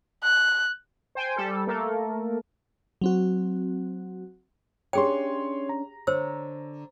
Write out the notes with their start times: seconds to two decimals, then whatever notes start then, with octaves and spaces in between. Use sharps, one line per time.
0.24 F#6
1.15 C5 G5 G#5
1.36 G3 A4
1.67 A3 A#3 A4 A#4
3.01 F#3 C4 F#4
4.93 C#4 D4 G4 G#4 C#5 E5 G5 C6
5.69 A#5
6.07 D3 C5 C#5 E6